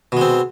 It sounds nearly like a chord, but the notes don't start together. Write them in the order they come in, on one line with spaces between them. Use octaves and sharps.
B2 G#3 C4